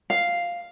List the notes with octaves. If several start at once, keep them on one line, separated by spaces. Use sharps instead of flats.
F5